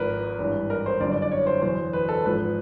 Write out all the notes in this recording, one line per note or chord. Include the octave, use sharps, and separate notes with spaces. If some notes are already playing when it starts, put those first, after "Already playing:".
Already playing: G#1 G#2 F3 A#4 B4
G#1 G2 E3
A#4
C5
G1 F#2 D3 D5
D5
D5
C#5
C5
E2 B2 F#3 C5
B4
A4
G#1 G#2 F3 B4